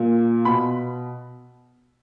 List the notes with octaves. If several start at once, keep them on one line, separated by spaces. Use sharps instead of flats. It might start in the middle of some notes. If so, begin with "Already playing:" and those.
Already playing: A#2
B2 B5